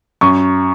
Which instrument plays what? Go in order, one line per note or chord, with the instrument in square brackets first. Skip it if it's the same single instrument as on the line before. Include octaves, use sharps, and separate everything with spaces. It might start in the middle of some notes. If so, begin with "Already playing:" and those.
[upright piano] F#2 C#6